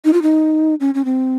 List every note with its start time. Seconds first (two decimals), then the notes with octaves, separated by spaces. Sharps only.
0.05 D#4
0.13 F4
0.22 D#4
0.80 C#4
0.94 C#4
1.05 C4